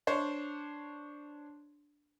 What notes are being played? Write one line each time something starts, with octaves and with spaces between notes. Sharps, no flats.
D4 C5 C#5